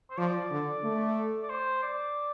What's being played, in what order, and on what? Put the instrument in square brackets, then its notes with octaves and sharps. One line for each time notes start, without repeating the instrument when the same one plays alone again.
[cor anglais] C5
[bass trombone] F3 [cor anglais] D5
[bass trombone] D3
A3
[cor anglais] D5
C5
D5